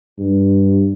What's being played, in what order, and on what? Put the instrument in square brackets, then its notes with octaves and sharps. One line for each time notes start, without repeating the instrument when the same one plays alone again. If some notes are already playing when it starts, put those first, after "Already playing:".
[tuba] G2